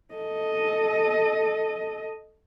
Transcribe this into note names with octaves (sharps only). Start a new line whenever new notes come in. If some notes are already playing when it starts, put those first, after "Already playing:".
A4 D#5